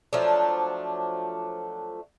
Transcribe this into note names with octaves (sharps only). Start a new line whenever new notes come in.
F3 F#3 A3 D4